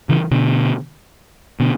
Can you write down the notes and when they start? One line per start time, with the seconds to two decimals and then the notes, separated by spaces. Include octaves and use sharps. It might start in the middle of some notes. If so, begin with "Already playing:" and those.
0.09 C#3 E3
0.31 B2 D3
1.60 B2 D3